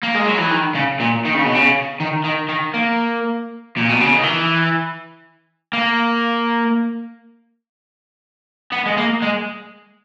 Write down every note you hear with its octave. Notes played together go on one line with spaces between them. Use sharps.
A#3
G#3
F#3
E3
D#3
C#3
A#2
D#3
C#3
B2
C#3
D#3
D#3
D#3
A#3
A#2
B2
C#3
D#3
E3
A#3
B3
G#3
A#3
G#3